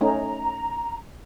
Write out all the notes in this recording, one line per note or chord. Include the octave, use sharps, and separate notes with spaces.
A3 C#4 D#4 A#5